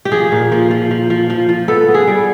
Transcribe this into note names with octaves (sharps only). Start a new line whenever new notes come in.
G4
F3 G#4
A#2
F3
F3
F3
F3
F3
F3
B3 A4
B3
G#4
G3